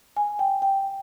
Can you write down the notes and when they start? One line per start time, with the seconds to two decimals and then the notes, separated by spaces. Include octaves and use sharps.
0.17 G#5
0.39 G5
0.62 G5